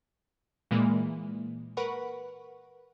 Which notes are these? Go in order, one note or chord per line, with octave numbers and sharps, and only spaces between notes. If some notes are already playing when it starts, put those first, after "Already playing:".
A#2 E3 G#3 A#3
A#4 B4 F#5 B5 C#6